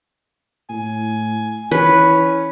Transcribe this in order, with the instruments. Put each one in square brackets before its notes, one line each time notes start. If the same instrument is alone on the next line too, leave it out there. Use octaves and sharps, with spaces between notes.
[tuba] A2 [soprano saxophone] G#5
[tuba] E3 [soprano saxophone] C#4 [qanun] B4